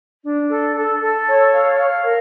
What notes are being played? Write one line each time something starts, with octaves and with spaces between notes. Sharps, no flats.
D4
A4
A4
A4
C#5
F5
F5
A#4